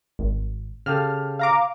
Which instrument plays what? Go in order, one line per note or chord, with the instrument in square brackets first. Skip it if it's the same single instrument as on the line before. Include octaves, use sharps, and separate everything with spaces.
[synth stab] G#1
[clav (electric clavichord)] C#3 G4 A4 [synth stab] F6
[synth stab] F5 A#5 D6